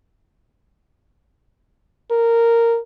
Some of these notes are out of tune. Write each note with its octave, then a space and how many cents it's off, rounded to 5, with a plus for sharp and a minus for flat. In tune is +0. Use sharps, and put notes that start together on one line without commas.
A#4 -10